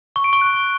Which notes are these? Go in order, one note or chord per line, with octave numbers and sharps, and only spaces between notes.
C#6
D7
C#6
F#6